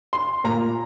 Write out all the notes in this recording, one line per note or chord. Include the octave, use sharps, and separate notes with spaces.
C6
A#2 A#5